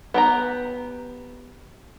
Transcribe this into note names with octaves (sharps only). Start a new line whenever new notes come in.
B3 G4 A#5